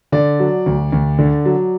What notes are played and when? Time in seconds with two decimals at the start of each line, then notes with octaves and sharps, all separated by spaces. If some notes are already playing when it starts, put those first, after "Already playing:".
0.12 D3 D5
0.40 F#3
0.66 D2
0.92 D2
1.19 D3
1.45 F#3